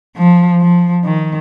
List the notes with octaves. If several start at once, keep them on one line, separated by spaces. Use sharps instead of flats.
F3
F3
D#3